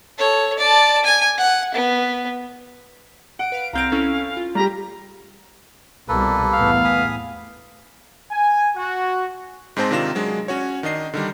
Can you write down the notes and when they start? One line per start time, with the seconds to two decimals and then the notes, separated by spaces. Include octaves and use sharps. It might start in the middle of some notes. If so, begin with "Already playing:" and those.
0.18 A4 C#5
0.59 D5 A5
1.04 G#5
1.38 F#5
1.74 B3
3.39 F#5 D7
3.52 B4 F5
3.73 C2 C4 F5 A#5 G6 A#6 D7
3.92 C#4 E4 A4
4.37 F4
4.55 G3 G4 A#5
6.08 C2 B2 G3 A#3 A4 B4
6.54 E2 A2 B3 F5
6.84 G#5 B5 D#6
8.30 G#5
8.76 F#4
9.77 G#2 G#3 C4 C5 A5 A#6
9.91 C3 D#3 D4 F4 A#6 E7
10.15 F#3 G#3 D4
10.48 C#4 F#4 C#5
10.83 D#3 D4 D#5 C7
11.14 D3 D#3 G3